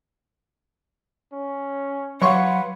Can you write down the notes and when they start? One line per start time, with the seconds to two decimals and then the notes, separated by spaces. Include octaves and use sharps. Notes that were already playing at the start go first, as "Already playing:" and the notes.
1.33 C#4
2.22 F#3 B4 C#5 F5 F#5 C6 C#6